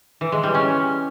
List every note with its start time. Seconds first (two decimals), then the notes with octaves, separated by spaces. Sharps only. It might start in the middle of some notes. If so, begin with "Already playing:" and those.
0.21 E3
0.32 G#3
0.43 G3
0.55 C#4